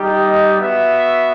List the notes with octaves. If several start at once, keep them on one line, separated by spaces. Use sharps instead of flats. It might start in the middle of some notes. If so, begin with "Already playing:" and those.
Already playing: G3 D#4 G4
D#5
B3 F#4 E5